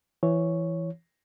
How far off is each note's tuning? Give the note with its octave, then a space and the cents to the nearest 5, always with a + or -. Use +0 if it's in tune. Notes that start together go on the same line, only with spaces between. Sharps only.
E3 +15 C#5 +0